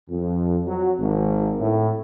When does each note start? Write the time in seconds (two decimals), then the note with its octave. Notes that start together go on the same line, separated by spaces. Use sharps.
0.10 F2
0.67 F#3
0.99 G#1
1.60 A2